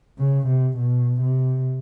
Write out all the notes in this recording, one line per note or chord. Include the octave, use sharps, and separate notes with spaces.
C#3
C3
B2
C3